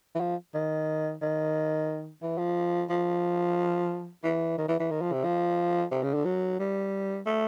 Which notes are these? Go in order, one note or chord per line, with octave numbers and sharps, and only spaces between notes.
E3
F3
D#3
D#3
E3
F3
F3
E3
D#3
E3
E3
D#3
F3
C3
F3
C3
C#3
D3
F#3
G3
A3